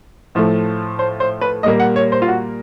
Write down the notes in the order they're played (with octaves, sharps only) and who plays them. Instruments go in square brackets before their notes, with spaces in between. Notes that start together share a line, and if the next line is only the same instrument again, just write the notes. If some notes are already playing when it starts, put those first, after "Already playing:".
[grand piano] A2 F3 A3
C5
C5
B4
A#2 G3 A#3 D#5
F#5
C#5
C5
F4
F#4